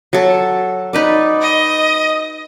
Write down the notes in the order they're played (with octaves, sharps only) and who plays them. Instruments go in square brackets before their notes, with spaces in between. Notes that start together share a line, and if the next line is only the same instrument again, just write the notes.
[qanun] F#3 A4
D#4 B4 D5
[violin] D#5